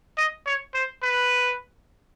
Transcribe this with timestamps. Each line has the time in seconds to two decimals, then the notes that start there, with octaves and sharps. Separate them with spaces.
0.18 D#5
0.46 C#5
0.74 C5
1.02 B4